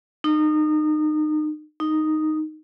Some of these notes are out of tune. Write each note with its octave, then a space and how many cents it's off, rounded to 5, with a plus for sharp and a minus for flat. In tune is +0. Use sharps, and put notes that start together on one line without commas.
D#4 -30
D#4 -5